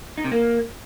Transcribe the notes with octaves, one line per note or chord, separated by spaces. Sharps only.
D#4
C3
A#3